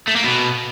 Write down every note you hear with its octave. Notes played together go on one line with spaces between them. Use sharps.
A3
A#3
B2